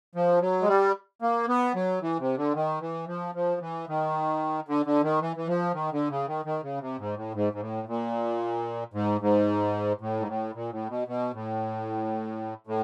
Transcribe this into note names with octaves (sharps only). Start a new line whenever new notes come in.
F3
F#3
G#3
G3
A#3
B3
F#3
E3
C3
D3
D#3
E3
F3
F3
E3
D#3
D3
D3
D#3
E3
E3
F3
D#3
D3
C#3
D#3
D#3
C#3
C3
G#2
A2
G#2
G#2
A2
A#2
G#2
G#2
A2
G#2
A2
A#2
A2
B2
B2
A2
A2